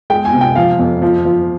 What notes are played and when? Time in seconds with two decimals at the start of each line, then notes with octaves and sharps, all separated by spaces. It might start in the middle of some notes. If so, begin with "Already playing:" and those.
0.10 G#3 G5
0.25 G#5
0.33 C3
0.41 G5
0.56 F3 F5
0.79 F2
1.02 F3
1.25 F3